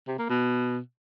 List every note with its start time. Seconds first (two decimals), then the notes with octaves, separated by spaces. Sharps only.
0.08 C3
0.18 A#3
0.29 B2